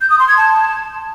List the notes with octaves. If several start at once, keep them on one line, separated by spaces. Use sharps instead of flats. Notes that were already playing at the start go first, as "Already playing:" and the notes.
G6
D#6
C6
G#6
A5